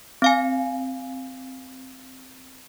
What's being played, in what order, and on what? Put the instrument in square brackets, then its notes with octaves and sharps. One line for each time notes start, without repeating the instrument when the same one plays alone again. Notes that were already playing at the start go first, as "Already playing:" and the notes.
[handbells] C4 F5 G#5